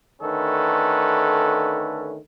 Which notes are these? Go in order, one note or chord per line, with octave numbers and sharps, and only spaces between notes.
D3 D#3 A3 C#4 A4 B4